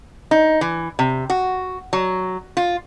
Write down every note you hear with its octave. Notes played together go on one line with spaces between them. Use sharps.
D#4
E3
C3
F#4
F#3
F4